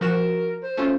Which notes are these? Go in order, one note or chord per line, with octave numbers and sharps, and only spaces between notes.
F3 F#4 A#4 E7
C5
A3 C#4 F4